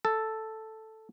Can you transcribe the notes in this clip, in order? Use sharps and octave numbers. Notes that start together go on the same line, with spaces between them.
A4